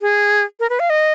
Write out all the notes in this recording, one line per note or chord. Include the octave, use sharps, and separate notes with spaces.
G#4
A#4
B4
F5
D#5